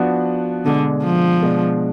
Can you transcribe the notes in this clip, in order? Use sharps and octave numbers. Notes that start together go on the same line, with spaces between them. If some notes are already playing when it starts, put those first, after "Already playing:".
Already playing: F3 B3 D4 F#4
B2 D3 G#3 D4
F3
B2 G#3 D4